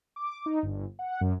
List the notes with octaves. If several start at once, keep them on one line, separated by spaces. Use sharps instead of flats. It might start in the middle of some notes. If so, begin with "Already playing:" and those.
D6
D#4
G1
F#5
F#2